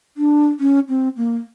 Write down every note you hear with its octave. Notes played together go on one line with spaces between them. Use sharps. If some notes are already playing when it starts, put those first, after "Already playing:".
D4
C#4
C4
A#3